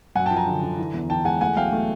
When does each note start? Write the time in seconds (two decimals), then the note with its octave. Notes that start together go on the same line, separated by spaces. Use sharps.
0.15 F#2 F#5 G#5
0.26 G5 A5
0.31 F3
0.36 G#5 A#5
0.47 D3
0.63 D3
0.79 E3
0.94 E2
1.10 E3 G5 A5
1.25 G#3 F#5 G#5
1.41 A3 F#5 G#5
1.57 B1 F5 G5
1.73 A3